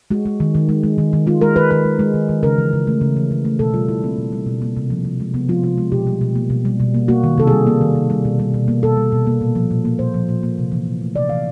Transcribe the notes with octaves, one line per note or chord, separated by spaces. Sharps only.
G#3 F#4
G#3
D#3
D#3
G#3
G#3
D#3
D#3
G#3 F4
G#3 A#4
D#3 B4
D#3 B4
G#3
G#3
D#3
D#3
C#3 A#4
E3
C#3
A3
C#3
E3
C#3
A3
B2 A4
G3 F4
B2 E4
A#3 C4
B2
G3
B2
A#3
C3
F3
C3
G#3
C3 B3
F3 F4
C3 F4
G#3
B2 G4
G3
B2
A#3
B2
G3
B2
A#3
A#3 F#4
D#3
C3 A4
G3 G#4
A#3
D#3
C3
G3
B2
G3
B2
A#3
B2 A4
G3
B2
A#3
A#2
F3
A#2
A#3
A#2 C5
F3
A#2
A#3
C3
E3
C3
A3
C3 D5
E3 F5